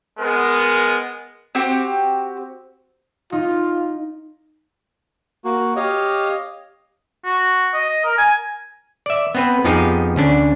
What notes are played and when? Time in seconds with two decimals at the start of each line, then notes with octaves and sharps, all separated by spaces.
0.19 G#3 B3 A#4
1.55 C4 F#4 G4 C5
3.32 D#4 F4
5.45 A#3 F#4
5.76 G4 C#5 D#5 F5
7.24 F#4
7.74 D#5
8.05 A#4
8.18 G#5
9.06 D5 E5
9.35 B3 C4 B4
9.64 F2 F3 B3 D#4 G4 G#4
10.16 D2 C#4 D4